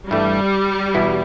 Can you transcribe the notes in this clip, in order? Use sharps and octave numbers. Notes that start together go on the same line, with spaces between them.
G2 E3 G3 A3
E2 B2 B3 E4